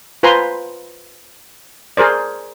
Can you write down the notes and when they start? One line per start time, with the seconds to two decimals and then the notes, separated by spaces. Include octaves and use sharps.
0.23 F4 B4 C5 G#5 A#5 C6
1.97 G#4 A#4 C5 D5